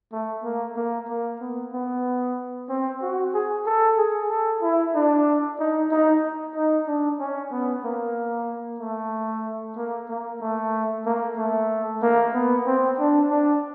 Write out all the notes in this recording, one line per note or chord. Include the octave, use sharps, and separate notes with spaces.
A3
A#3
A#3
A#3
B3
B3
C4
F#4
G#4
A4
G#4
A4
E4
D4
D#4
D#4
D#4
D4
C#4
B3
A#3
A3
A#3
A#3
A3
A#3
A3
A#3
B3
C4
D4
D4